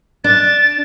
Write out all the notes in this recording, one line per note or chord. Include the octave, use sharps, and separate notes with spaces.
D4 A6